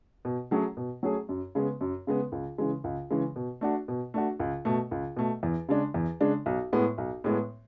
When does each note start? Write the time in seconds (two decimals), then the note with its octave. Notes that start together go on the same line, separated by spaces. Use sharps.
0.25 B2
0.51 F#3 A3 C#4 G#4
0.77 B2
1.03 F#3 A3 C#4 G#4
1.29 F#2
1.55 C#3 G#3 B3
1.81 F#2
2.07 C#3 G#3 B3
2.32 C#2
2.58 C#3 E3 G#3
2.84 C#2
3.11 C#3 E3 G#3
3.36 B2
3.61 A3 D4 F#4
3.88 B2
4.14 A3 D4 F#4
4.40 C#2
4.65 B2 A3
4.91 C#2
5.17 B2 A3
5.43 E2
5.69 C#3 G#3 D4
5.94 E2
6.21 C#3 G#3 D4
6.46 B1
6.73 A2 G#3 B3
6.98 B1
7.24 A2 G#3 B3